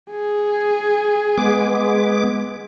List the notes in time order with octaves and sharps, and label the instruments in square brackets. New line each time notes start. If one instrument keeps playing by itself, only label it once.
[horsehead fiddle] G#4
[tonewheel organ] G#3 B3 D6